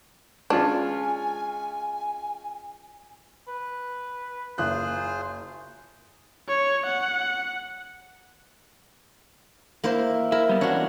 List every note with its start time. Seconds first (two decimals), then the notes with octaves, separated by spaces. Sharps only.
0.50 G#3 C#4 D4 F4 G#5
3.48 B4
4.58 F#1 F4 G#4 C5 F#6
6.48 C#5
6.86 F#5
9.84 A#3 E4 C5
10.32 E4 A#4
10.49 G3 B3
10.61 E3 C#4 D4 F#4 C#5